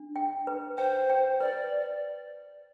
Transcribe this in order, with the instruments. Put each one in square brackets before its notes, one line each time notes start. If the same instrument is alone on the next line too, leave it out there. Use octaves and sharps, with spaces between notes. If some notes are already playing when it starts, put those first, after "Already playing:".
Already playing: [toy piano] D4
G5
B4
[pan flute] C5 [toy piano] G5
[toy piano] G5
[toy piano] B4 [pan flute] D5